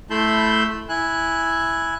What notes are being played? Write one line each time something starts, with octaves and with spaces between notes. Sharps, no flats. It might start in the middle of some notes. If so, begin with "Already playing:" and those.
A3 E4 A5 B5 C6 G6
E4 G#5 F#6